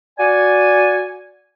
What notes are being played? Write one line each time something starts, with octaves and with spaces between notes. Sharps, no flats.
F#4 D5 G#5